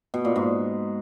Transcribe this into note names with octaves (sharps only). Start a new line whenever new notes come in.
B2
A#2
G#2